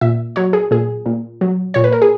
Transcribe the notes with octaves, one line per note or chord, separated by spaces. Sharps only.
A#2 E5
F#3 C#5
G#4
A#2 G#4
A#2
F#3
A#2 C#5
B4
A#4
G#4